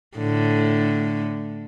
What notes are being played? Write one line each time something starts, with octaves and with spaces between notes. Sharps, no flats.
A2 D3